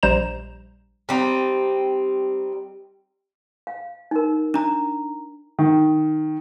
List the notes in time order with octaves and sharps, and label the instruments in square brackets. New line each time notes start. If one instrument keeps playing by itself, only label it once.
[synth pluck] A#1 G3 C5 A#5 E7
[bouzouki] G3 C4 D#4
[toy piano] F5
D#4 A#4
[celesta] D4 A#5
[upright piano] D#3